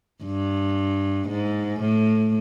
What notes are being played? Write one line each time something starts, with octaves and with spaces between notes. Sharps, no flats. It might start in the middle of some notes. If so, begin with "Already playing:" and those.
G2
G#2
A2